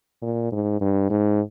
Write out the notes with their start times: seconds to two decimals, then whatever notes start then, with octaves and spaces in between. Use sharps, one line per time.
0.22 A#2
0.52 G#2
0.81 G2
1.10 G#2